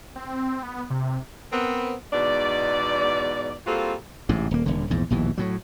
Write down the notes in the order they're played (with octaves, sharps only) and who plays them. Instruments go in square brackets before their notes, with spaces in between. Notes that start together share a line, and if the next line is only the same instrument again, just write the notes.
[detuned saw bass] C4
B3
C3
[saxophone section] B3 C4 A#4
E2 G#2 B2 D5
G3 A#3 C4 F4 F#4 A4
[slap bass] A1 G#2 C3
D#1 A#3
D#1 D3
A#1 E2 G#2
A#1 D#2 B2 E3
A2 F#3